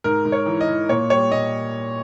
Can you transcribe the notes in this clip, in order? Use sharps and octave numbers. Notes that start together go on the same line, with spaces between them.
G#2 A#4
G#2
C#5
E3
D#5
E3
A#2 C#5
G3 C#5
A#2 D#5